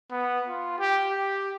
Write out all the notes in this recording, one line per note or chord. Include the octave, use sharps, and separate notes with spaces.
B3
F4
G4
G4